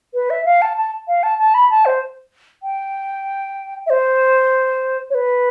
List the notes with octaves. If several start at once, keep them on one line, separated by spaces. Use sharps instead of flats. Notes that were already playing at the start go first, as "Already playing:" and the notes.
B4
E5
F5
A5
A5
F5
A5
A5
B5
A5
C5
G5
E5
C5
C#5
B4